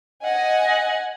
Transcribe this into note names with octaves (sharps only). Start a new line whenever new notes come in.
D#5 F#5 G#5